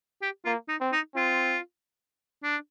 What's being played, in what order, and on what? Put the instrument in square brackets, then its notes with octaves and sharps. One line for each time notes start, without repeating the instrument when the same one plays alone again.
[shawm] G4
[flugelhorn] A#3 [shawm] F4
[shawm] D#4
[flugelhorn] C4
[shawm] D#4
[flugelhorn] C4 [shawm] F4
[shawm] D4